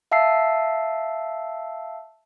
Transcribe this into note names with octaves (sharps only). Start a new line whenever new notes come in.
E5 F5 A5 E6 C7